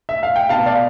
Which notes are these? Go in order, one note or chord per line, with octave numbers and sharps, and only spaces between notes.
E5
F5
G5
B2 B3 F5 A5
D5 F5